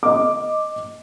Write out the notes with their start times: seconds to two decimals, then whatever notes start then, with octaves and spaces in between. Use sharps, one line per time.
0.03 D#5 D6